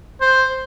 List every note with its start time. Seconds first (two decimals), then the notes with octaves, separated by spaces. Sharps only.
0.21 C5